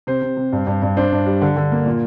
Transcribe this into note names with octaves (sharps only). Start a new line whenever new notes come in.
C3 C5
C3
C3
G2
G2
G2
D4 C5
G2
G3
D3
D3
A#3
A#2